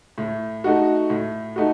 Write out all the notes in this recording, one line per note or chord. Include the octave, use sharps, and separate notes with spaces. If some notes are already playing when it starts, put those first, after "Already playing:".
A2
A3 D#4 F#4
A2
A3 D#4 F#4